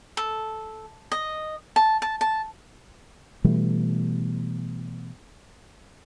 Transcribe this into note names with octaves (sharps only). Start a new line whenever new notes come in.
A4
D#5
A5
A5
A5
B2 E3 G3 A3